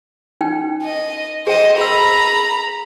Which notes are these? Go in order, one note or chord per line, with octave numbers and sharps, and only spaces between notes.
C#4 D#4 G5
D#5
G#4 C5 D#5 G5
G#4 A#5 B5 E6